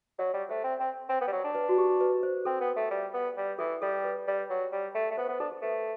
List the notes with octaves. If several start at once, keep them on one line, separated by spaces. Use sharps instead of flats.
F#3 D5
G3 D5
A3 C5
C4
C4
C4
B3
G3
F#3
D4
B4
F#4
G4
B4
C5
C4 A4
B3
A3
G3
B3
G3
E3 A4
G3 A4
B4
G3
F#3
G3
A3
A3
B3 C5
B3 C5
D4 A4
A4
A3 B4